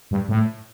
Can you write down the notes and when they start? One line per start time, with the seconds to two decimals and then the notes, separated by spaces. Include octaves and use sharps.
0.11 G2
0.29 A2